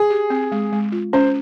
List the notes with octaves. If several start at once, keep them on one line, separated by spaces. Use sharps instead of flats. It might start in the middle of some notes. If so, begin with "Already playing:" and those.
Already playing: G#4
G4
C4
G#3
G#3
F4
C#4 C5